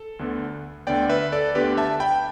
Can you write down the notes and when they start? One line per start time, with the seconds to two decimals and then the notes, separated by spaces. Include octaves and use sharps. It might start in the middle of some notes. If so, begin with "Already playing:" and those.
Already playing: A4
0.19 D2 D3 B3
0.87 D2 D3 B3 D5 G5
1.09 B4 E5
1.32 A4 D5
1.55 D2 D3 B3 G4 B4
1.77 E5 A5
2.00 G5 B5